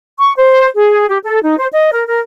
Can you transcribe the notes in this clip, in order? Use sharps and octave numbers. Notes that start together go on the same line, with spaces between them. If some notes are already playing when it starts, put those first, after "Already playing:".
C#6
C5
G#4
G4
A4
D#4
C5
D#5
A#4
A#4